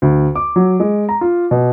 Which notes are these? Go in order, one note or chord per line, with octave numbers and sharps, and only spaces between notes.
D2
D6
F#3
G#3
A#5
F4
B2